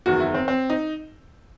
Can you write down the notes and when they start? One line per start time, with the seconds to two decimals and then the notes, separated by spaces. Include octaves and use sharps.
0.06 F#1 E2 D#3 F#4
0.20 E4
0.34 C4
0.48 C4
0.70 D#4